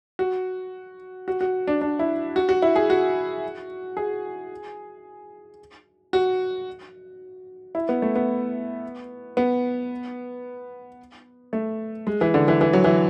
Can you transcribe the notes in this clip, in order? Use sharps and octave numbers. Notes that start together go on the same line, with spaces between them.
F#4
F#4
F#4
D4
D4
E4
F#4
F#4
E4
G#4
F#4
G#4
F#4
E4
B3
A3
B3
B3
A3
G#3
E3
D3
E3
E3
F#3
E3